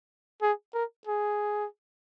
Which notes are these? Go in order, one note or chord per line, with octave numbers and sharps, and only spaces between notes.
G#4
A#4
G#4